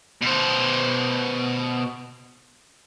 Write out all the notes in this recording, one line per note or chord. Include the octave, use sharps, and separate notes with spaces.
B2 C5